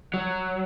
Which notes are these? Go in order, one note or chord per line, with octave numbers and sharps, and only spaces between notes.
F#3